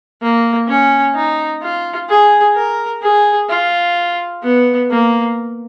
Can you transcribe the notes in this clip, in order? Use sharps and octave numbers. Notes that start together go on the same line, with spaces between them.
A#3
C#4
D#4
F4
G#4
A#4
G#4
F4
B3
A#3